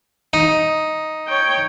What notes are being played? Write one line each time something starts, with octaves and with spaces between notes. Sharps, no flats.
D#4
C#5 G5